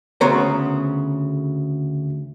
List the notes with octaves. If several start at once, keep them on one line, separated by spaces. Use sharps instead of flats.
D2 C#3 B3 C5 C#5 A#5